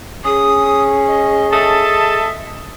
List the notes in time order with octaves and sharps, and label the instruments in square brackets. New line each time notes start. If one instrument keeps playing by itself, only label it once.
[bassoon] C#4 [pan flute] G#4 [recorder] D#6
[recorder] D#5
[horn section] A4 D#5 A5 [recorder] E5